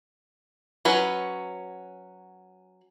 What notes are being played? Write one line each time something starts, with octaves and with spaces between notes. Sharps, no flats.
F#3 C#4 B4